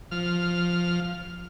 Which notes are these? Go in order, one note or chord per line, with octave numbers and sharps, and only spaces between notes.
F3 F6